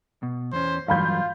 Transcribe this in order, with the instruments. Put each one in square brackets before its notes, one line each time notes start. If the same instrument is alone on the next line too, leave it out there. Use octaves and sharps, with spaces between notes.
[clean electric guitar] B2
[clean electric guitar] E2 C#4 [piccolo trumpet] C5
[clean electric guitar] G2 E3 F#3 [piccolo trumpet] F4 [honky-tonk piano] F5 B5 G6